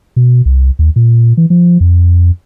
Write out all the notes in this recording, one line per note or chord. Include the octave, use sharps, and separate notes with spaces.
B2
C2
D#2
A#2
E3
F3
F2